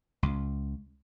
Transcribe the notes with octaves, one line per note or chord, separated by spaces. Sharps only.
C#2